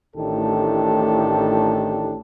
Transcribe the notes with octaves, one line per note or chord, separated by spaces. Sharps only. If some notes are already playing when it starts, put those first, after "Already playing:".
A1 A2 D#3 D4 G4 A4